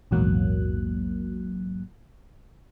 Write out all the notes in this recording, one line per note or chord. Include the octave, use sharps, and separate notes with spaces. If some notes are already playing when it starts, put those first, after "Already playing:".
A#1 E2 G#2 F#3 A#3 F#6